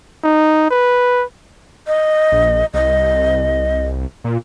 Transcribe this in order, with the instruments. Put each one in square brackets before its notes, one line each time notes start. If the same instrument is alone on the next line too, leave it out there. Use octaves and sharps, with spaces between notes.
[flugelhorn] D#4
B4
[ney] D#5
[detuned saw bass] A#1
[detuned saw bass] C2 [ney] D#5
[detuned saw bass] A#2